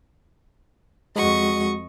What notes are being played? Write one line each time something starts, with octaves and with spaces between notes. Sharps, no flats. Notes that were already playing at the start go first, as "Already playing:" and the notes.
F2 G#3 F#4 D#5 C#6